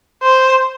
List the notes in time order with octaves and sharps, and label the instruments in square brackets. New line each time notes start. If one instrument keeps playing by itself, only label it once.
[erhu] C5